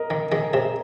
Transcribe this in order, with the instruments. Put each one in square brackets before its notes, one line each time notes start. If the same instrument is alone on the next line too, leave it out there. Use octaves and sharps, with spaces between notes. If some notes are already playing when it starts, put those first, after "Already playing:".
Already playing: [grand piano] A#4 D#5
[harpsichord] D#3
[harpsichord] D#3 [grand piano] G#4
[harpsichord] C3